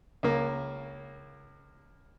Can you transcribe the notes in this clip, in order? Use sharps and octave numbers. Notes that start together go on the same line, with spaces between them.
C#2 A#3